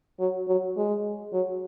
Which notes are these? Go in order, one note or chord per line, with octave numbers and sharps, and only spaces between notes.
F#3
F#3
G#3
F#3